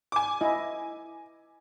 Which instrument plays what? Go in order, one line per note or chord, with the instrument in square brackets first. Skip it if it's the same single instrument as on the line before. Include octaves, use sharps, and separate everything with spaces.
[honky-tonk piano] G#5 D6
[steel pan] E4 D#5